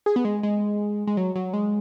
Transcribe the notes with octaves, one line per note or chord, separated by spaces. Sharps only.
G#4
B3
G#3
G#3
G#3
F#3
F#3
G#3